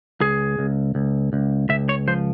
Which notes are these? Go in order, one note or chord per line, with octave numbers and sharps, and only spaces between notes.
C#2 G#4
C#2
C#2
C#2
C#2 E5
C#5
F3 C5